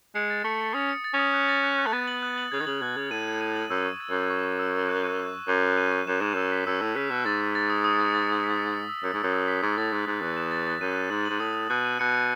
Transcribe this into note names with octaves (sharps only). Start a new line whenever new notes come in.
G#3 C#7
A6
A3 C#7
C#7
C#4 D#6
C#7
A6
C#4
D#6
F#6
A6
F#6
F#6
A3
B3 A6
F#7
F#6
F#7
C#3 G#6
D#3
C#3 F#7
B2 G#6
C#3 G#6
A2 D#7
G#6
D#7
F#7
F#2 E6
C#6
G#6
F#2 G#6
C#6
C#6
E6
E6
F#6
D#7
C#6
C#6
F#2 D#7
F#6
D#7
D#7
F#2 E7
G#2 E7
F#2 E6
B6
F#2 E6
A2 E6
C#3 B6
B2 E7
G#2 A6
A6
A6
D#6
D#6
A6
A6
D#6
B6
E6
E6
E6
F#2 E6
G#2 E6
F#2
E6
B6
G#2 F#6
A2 A6
G#2 F#6
G#2 F#6
E2 F#6
E7
A6
A6
F#2 D#7
D#7
G#2 F#7
G#2 F#7
A2 D#6
D#6
B2 D#7
D#7
B2 C#7
C#7